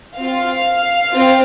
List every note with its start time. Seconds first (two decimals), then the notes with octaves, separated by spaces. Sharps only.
0.17 C4 F4 F5
1.11 C4 F4